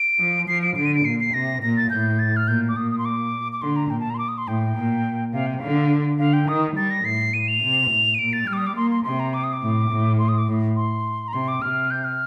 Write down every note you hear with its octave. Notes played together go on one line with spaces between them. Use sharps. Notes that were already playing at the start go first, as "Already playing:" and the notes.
Already playing: D7
F3
F3 C7
D7
D3 D7
D#7
D7
A#2 C7
C7
C3 A#6
A#2 A#6
A6
A2 G6
A6
F6
A#2 G6
D6
A#2 D#6
D#6
C6
D6
D6
D3 C6
A#5
A#2 G5
A5
A#5
C6
D6
D#6
C6
A2 G5
A#2
C3 F5
G5
D3 F5
D3 F5
G5
D#3 D#6
G3 A6
A#6
A2 C7
A2 D#7
F7
C3
A2
D#7
A#2 D7
A6
G3 F6
D6
D#6
D6
A#3 C6
C6
C3 C6
A#5
D6
D#6
D6
A2
A2
C6
D#6
D6
A2
C6
A#5
C3 C6
D6
C3 F6
G6
F6